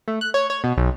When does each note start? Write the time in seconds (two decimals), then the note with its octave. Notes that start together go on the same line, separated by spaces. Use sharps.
0.08 A3
0.21 F#6
0.34 C#5
0.50 C#5
0.64 B2
0.77 B1